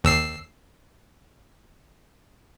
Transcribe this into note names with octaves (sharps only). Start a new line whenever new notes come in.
D#2 E6 C7